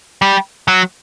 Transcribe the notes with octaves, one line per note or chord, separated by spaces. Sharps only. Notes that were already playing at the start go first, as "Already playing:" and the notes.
G3
F#3